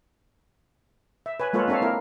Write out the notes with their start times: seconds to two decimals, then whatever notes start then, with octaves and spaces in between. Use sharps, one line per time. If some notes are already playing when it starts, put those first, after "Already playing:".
1.26 E5
1.40 B4 C#5 G#5
1.53 G#3 A#3 F4 A4 B4 C#5
1.68 C4 D4 A4 C#5 F5
1.82 A#3 C4 E4 A#4